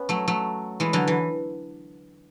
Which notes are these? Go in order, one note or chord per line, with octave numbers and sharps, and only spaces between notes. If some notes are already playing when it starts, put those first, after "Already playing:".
Already playing: B3 C#4
F#3 A3
F#3 A3
E3 G#3
D3 F#3
E3